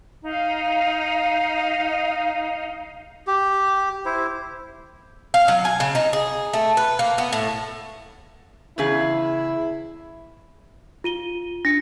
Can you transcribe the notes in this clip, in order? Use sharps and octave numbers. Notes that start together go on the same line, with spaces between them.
D#4 F5
G4
E4 C5
F5
F#3
G#5
C#3
D#4
G#4
A3
B4
A#3
B3
A2
E2 C#3 E4 G#4
F4 D#7 G7
D4 A#6 C#7